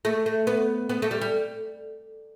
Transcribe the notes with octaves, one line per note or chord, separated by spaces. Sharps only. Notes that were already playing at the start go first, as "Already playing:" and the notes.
A3
A3
B3
B3
A3
G3
G3